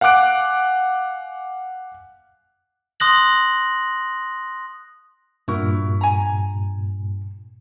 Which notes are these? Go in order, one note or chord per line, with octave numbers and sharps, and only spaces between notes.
F5 F#5 G#5 D6 F#6 D7
C6 D#6 F#6 A#6 F#7
G2 A#2 E4 F#4 A#4
G#5 A#5